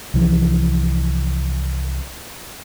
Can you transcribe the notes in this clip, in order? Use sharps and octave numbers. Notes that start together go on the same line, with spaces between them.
C2 E3 F3